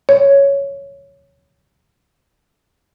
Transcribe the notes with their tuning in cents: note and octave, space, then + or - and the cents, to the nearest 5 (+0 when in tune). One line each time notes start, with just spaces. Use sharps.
C#5 +5